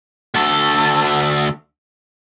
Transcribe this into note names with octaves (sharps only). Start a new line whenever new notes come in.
D2 A4